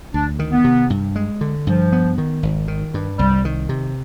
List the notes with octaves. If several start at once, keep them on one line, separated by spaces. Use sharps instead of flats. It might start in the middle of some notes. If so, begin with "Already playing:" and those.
D2 D4
D#3
B3
C3
G2
G#3
D3
G2 F3
B3
D#3
G#1
D#3
G2
C2 G3
D#3
C3